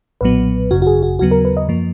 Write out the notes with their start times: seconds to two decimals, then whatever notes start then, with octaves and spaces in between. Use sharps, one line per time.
0.21 B1 A#2 F#3 B3 B4
0.71 G#1 F#2 C#3 F#4
0.82 F#4
0.87 G#4
1.03 F#4
1.19 D#2 C#3 F#3 B3 F#4
1.31 A#4
1.45 B4
1.57 D#5
1.68 F#2 F3 A#3